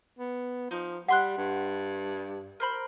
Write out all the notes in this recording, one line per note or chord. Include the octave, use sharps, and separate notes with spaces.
B3
F3 D#4
G3 E5 F#5 C6 F#6
G2
A#4 C5 B5